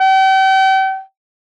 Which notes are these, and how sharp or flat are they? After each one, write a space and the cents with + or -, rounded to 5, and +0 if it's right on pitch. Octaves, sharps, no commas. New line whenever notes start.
G5 -40